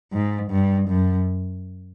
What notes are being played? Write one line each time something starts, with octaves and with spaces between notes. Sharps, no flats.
G#2
G2
F#2